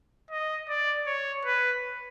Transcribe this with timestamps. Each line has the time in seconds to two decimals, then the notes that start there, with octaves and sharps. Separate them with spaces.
0.30 D#5
0.69 D5
1.07 C#5
1.45 B4